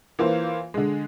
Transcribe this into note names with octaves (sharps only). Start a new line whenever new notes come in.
E3 A#3 F4 C5
D3 G#3